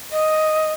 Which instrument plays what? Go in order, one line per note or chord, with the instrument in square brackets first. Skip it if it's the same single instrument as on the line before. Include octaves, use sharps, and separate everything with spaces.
[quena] D#5